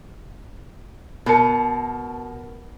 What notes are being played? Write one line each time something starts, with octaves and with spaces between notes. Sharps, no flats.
B2 A#4 A5 C#7